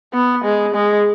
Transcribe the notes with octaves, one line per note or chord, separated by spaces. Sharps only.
B3
G#3
G#3